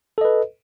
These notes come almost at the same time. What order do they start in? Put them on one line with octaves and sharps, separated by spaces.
A4 D#5 B4